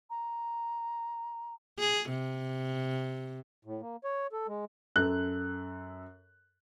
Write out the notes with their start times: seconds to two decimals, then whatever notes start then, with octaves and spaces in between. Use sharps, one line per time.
0.10 A#5
1.79 G#4
2.10 C3
3.65 A2
3.81 A#3
4.04 C#5
4.32 A4
4.48 G#3
4.96 F#2 A4 F#6